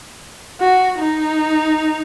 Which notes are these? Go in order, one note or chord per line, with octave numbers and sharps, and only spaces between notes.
F#4
D#4